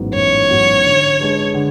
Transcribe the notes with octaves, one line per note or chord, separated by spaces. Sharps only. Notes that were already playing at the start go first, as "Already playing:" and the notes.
Already playing: A1 G#2 F#3 B3
A1 C#5
G#2 F#3 B3
D3
G#3 D4 G#4 B4
D3